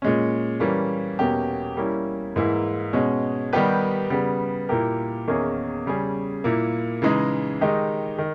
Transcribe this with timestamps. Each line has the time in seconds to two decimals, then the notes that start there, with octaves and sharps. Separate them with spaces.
0.02 A#2 G#3 C#4
0.60 E3 G3 A#3 C#4
1.19 E2 B2 A#3 C#4 G4
1.77 G3 A#3 C#4 E4
2.36 G#2 E3 A#3 E4 G#4
2.93 B2 G#3 C#4
3.53 D#3 G3 B3 G4 B4
4.10 C#3 G3 B3
4.69 A#2 A#3 E4 G4 A#4
5.27 E2 D#3 A#3 C#4 G#4
5.86 C#3 G3 C#4 G#4
6.44 A#2 A#3 E4
7.02 C#3 E3 G#3 D#4
7.61 D#3 G#3 D#4 G4
8.18 D#3